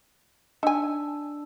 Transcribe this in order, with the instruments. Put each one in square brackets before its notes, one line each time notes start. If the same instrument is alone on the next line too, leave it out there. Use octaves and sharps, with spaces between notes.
[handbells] D4 E6 [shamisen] D#4 G#5